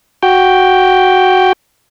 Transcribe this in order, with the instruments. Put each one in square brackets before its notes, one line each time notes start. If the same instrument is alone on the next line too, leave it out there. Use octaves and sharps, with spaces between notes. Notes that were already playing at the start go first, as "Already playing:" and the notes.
[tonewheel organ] F#4 G5